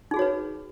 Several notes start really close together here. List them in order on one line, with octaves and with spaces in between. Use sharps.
D#4 G#4 F#4 C#5 B4